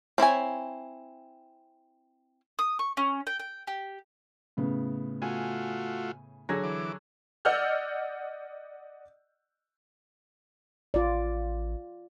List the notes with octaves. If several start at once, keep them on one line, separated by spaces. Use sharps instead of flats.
C4 E4 C#5 G#5
D#6
C#6
C#4
G5
G5
G4
A2 C#3 B3
A3 F4 F#4 G#5
D3 F#3 G#4 A#6
E3 D6
D5 D#5 F#5 E6 F6 G6
A1 F4 D5